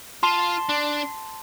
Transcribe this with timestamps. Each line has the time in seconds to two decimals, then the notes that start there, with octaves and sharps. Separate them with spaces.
0.23 F4 A5 C6
0.69 D4